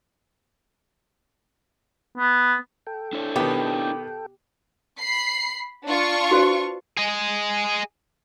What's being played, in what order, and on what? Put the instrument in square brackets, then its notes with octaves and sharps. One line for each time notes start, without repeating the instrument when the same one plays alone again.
[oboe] B3
[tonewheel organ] A4 G5
[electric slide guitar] D4 E4 C#5
[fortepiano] B2 D#3 B3 [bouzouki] G4
[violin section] B5 C7
D4 F4 C#6
[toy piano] F#4 B4 C5
[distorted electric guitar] G#4 D#5